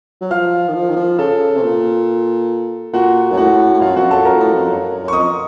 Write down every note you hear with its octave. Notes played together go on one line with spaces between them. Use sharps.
F#3
F3 F5 F6
D#3
F3
D#3
F3
C#3 A4 A5
C3
A#2
A#2 F#4 F#5
F#2
A2 F#4 F#5
A2
F#2 F4 F5
F2 F#4 F#5
F#2 A4 A5
F#2 A#4 A#5
A#2
A2
F2
F#2
F#2
C#6
F2 D#5 D#6